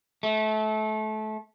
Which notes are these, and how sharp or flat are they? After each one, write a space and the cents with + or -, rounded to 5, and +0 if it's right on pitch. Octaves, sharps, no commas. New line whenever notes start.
A3 -25